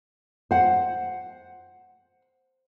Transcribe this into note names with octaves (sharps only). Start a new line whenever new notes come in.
C5 F#5